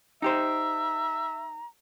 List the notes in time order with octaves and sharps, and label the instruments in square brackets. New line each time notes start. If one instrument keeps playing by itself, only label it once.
[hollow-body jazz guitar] D#4 G4 C5 [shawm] E5 [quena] A#5